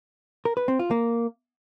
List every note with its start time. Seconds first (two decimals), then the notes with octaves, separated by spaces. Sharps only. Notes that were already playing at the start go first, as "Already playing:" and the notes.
0.45 A#4
0.57 B4
0.68 C4
0.79 F4
0.91 A#3